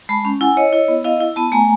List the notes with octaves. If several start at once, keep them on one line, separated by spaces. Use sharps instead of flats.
G#3 A5 B5
C#4
E4 F#5 G#5
E4 C#5 D#5
E4
B3
E4 D#5 F5
E4
B3 A5 B5
A3 G#5 A#5